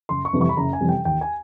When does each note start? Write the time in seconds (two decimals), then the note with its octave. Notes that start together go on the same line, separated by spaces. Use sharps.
0.09 F#1 C6
0.25 C#6
0.33 F2 C3 E3 G3
0.41 C#6
0.49 B5
0.57 F#1 A#5
0.73 G#5
0.81 F2 C3 E3 G3
0.89 G5
1.05 D#2 G5
1.21 G#5